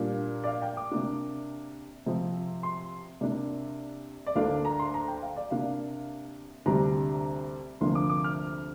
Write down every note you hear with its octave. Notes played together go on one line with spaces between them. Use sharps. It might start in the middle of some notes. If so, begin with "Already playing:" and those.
Already playing: A#2 G3 A#3 D4
D5
F5
G5
D6
C3 A#3 D4
C3 F3 C4
C6
C3 A#3 D4 D5
D5
D2 D3 A#3 D4 F5
A#5
C6
A#5
G5
F5
D5
C3 A#3 D4 F5
D2 C3 G3 D4 A#5
D2 C3 F3 A#3 D4 C6
D6
D6
F6